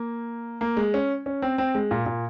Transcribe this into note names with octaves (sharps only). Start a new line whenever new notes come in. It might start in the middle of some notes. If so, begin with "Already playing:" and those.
Already playing: A#3
A#3
G#3
C#4
C#4
C4
C4
G#3
A#2
A#2